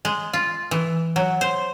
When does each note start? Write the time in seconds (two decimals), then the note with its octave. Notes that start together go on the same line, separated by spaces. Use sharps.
0.05 G#3
0.33 F4
0.71 E3
1.16 F#3
1.41 C5